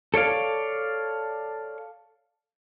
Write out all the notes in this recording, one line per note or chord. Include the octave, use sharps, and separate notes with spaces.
A4 C#5 D5 F5